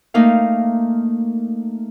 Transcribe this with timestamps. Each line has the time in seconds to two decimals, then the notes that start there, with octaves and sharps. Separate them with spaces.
0.14 A3 A#3 D#4 A#4 F5